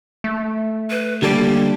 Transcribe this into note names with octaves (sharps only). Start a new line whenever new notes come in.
A3
B4
D3 G3 A#3 A4 D5